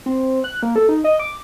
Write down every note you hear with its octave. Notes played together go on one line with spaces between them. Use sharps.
C4
F#6
A#3
A4
D#4
D#5
D6